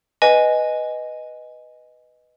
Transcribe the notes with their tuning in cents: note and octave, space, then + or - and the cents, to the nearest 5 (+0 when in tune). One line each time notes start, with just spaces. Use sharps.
B4 +0 D#5 +0 G#5 +0